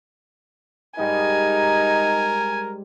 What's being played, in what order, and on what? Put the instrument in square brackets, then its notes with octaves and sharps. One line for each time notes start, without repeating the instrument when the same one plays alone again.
[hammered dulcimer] G#2 G3 [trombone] D#4 [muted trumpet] A#4 [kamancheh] G#5